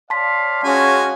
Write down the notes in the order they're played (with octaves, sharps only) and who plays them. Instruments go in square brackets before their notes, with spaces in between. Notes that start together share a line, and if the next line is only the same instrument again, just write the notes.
[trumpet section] C#5 D5 F5 [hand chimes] A5 C6 B6
[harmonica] G#3 G#5 [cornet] C#4 [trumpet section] F4 F#4